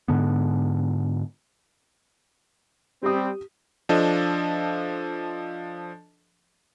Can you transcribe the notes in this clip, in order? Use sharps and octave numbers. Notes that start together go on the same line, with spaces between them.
G#2 D3 B3
G3 C4 G4 D#6
F3 D4 A4 D#5